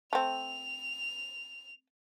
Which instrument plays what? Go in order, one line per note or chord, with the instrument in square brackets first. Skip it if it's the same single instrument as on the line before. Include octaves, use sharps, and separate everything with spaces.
[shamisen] A3 C4 [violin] F7